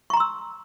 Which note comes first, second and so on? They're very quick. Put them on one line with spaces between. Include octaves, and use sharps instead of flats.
C#6 A#5 C6 E6